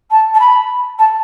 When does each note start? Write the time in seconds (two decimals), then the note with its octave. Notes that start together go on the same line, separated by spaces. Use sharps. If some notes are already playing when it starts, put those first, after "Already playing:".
0.10 A5
0.34 A5
0.39 B5
0.98 A5